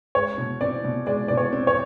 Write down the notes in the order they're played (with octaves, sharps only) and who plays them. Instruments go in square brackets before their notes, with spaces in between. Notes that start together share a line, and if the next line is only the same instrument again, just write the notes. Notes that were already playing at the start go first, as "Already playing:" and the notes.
[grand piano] G#3 [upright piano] C#5
[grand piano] B2
[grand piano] C4 [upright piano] D5
[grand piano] B2
[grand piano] G#3 [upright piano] D5
[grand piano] B2 [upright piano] D5
[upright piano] C#5
[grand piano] C4
[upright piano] C#5